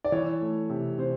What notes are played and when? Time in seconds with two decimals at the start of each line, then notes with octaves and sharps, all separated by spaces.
0.05 D5
0.12 E3 C#5
0.41 A3
0.70 C3
0.98 C3 C5